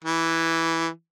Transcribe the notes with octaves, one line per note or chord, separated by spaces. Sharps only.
E3